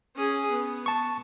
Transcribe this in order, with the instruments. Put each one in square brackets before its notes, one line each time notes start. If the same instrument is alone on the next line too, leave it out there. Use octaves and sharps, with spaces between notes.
[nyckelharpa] C#4 G#4
B3
[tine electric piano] A5 C#6